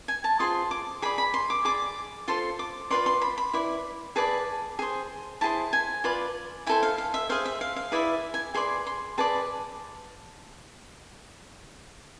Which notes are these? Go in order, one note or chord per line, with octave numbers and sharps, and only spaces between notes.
G#5
A5
F4 G#4 C5 C6
D6
G#4 D5 B5
B5
C6
D6
G#4 D5 D6
F4 A4 C5 C6
D6
F4 B4 D5 C6
C6
B5
B5
E4 B4 D5
G#4 B4 D5 A5
G#4 C5
E4 G#4 C5 A5
G#5
F4 B4 D5
E4 A4 C5 G#5
F5
F5
E5
G#4 C5 F5
E5
F5
F5
E4 G#4 B4 D5 E5
G#5
G#4 B4 D5 C6
C6
G#4 B4 D5 A5